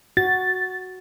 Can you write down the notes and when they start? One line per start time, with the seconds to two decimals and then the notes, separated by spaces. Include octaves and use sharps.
0.17 F#4 A6